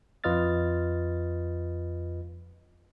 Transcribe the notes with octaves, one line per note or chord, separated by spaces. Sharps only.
F2 F4 B4 D#5 F6 A6